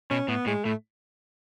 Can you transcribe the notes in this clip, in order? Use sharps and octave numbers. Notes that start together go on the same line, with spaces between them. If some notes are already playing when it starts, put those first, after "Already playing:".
B2 C#4
A2 B3
A2 G#3
A2 A3